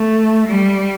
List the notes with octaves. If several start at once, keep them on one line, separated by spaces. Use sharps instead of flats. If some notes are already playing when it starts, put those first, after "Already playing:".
Already playing: A3
G3